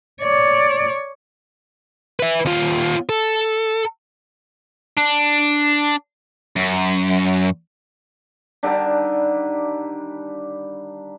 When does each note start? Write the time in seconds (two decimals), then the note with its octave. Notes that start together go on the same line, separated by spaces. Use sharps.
0.22 C#5 D5
2.20 B4 E5
2.45 D#2 F4
3.09 A4
4.97 D4
6.56 F#2
8.63 D3 D#3 G3 D4